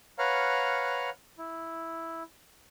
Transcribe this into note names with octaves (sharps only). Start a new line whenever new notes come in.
B4 C#5 F5 F#5 A#5 F6
E4